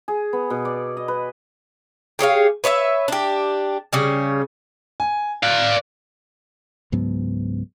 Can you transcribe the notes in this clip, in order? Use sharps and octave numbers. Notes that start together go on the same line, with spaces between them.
G#4
B3
B2
D5
D#5
B4
G4 G#4 C#5 F5
B4 C#5 D#5 E5
D4 G4
C#3 G3 C#4
G#5
D5 F5 F#6
C#2 G#2 F#3 B3